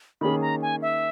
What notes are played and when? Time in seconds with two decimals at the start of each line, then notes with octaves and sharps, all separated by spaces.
0.21 D#3 A#3 C#4 G#4 B5
0.41 A#5
0.62 G#5
0.82 E5